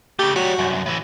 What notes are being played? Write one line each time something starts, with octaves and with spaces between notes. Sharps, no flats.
C#3 A3 G4
G3 F#4 C#5
C2 F#2
A2 E3